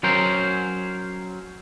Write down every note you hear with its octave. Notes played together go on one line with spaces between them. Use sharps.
F#3 C#4 A#4 C5